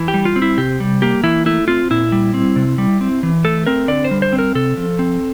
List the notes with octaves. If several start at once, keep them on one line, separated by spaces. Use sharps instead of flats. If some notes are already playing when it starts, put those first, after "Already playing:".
Already playing: E3
G4
G3
F4
C4
E4
C3 G4
G3
A#3 G4
E3 E4
A3 E4
C4 F4
A#2 E4
G3
C4
C3
G3
C4
E3
A3 A4
C4 A#4
D3 D5
C5
G3
C5
C4
A#4
C3 A4
F3
C4